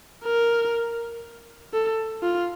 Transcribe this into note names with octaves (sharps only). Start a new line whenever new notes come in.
A#4
A4
F4